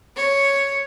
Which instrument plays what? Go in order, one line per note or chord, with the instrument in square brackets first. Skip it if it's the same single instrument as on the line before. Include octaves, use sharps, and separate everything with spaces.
[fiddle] C#5